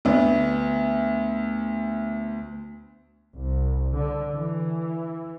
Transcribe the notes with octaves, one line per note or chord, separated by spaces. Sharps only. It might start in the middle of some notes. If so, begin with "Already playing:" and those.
D2 B3
C2
D3
E3